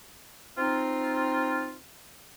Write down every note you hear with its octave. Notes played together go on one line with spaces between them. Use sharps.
C4 D#4 F4